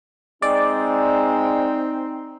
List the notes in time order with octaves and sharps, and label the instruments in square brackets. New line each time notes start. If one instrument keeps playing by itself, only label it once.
[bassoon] G#3 [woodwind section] C4 D#4 [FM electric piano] D5